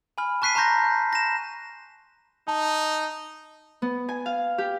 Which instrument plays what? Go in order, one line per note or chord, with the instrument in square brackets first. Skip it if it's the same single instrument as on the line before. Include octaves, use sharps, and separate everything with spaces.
[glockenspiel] G#5 B5 F6
A5 C#6 F#6 B6 C7 D#7
A5 A#5 C6 C#6 G6 A#6
A5
A#6 E7
[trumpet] D#4 [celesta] A5
[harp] B3
G#5
F5
G4